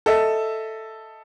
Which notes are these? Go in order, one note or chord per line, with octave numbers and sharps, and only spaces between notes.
A4 D#5 E5